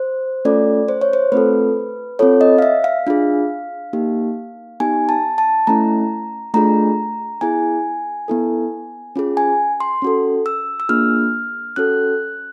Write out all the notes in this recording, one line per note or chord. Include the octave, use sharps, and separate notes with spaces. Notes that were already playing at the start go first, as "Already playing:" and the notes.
Already playing: C5
A3 C#4 F4 A4 D5
C5
C#5
C5
A3 C4 F4 A4 B4
C4 F4 A4 C#5
D#5
F5
E5
F5
D4 F4 G#4
A#3 D#4 G4
B3 D#4 G4 G#5
A5
A5
A3 C#4 E4 A#5
A3 D4 F4 G#4 A#5
B3 E4 G#4 G#5
B3 E4 A4
C#4 F4 G#4
G#5
C6
C#4 F#4 A4
E6
E6
A#3 D4 F4 G#4 F6
C#4 F#4 A4 F#6